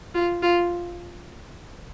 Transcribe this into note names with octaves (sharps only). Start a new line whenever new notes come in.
F4
F4